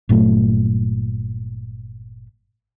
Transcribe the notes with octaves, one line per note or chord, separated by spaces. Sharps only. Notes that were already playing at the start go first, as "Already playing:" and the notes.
G1 A#2 F#3 A3